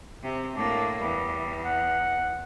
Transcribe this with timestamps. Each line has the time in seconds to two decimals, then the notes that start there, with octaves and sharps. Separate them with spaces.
0.23 C3
0.56 A2 A#3 D4
1.01 E2 G3
1.65 F#5